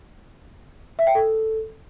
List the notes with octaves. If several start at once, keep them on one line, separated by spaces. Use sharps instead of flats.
E5
G5
A4